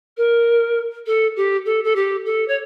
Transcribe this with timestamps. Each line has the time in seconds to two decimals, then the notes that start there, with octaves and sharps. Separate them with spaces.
0.17 A#4
1.07 A4
1.36 G4
1.65 A4
1.84 A4
1.96 G4
2.26 A4
2.48 C#5